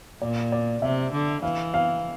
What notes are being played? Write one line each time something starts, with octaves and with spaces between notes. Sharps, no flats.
A#2 D5
D5
C3 E5
D3
E3 F5
F5